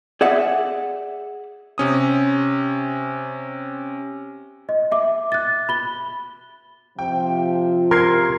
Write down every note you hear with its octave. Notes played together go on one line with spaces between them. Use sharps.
G#4 D5 E5 F#5
C3 C#4 D#6
D#5
E5 D6
F#6 A6
B5 G7
C3 F3 G5
A#4 C6 G#6 C7